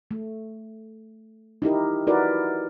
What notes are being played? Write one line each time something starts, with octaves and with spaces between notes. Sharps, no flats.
A3
D#4 E4 G4 A#4
D#4 E4 F#4 A#4 B4 D5